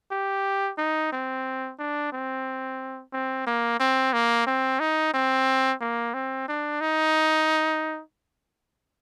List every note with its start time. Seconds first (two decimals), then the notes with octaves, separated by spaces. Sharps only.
0.11 G4
0.78 D#4
1.12 C4
1.79 D4
2.12 C4
3.13 C4
3.47 A#3
3.80 C4
4.13 A#3
4.47 C4
4.80 D#4
5.14 C4
5.81 A#3
6.14 C4
6.48 D4
6.81 D#4